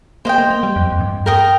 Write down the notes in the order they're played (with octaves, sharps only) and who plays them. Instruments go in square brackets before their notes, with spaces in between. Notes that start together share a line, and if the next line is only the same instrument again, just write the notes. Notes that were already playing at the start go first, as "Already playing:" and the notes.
[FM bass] A#3 [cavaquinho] C5 D#5 G5
[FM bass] A#3
A#3
G3
F2
F2
G2
[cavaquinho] A#4 G5 A#5 D#6